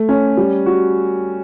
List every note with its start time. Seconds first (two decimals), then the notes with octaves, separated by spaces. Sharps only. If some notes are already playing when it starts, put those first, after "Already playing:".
Already playing: A3
0.09 C#4
0.37 G3
0.66 F#4